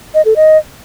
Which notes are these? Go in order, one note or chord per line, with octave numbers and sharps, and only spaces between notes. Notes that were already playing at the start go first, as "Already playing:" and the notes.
D#5
A4
D#5